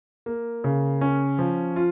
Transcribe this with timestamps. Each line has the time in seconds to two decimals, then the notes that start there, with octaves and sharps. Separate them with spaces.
0.26 A#3
0.64 C#3
1.01 C#4
1.39 F3
1.76 F4